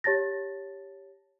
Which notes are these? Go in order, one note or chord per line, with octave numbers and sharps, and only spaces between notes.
G4 C#5 A5 A6 A#6